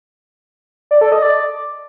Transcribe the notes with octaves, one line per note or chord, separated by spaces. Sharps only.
D5
A4
D#5
D5